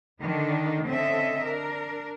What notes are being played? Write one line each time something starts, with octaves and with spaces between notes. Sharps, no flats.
D3 D#3 D4 D#4
D3 C4 C#4 A4 D#5 E5
D4 A#4